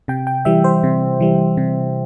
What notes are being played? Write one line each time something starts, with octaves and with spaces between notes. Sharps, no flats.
C3 G5
G5
E3 G3 E5
C5
C3
E3 G3
C3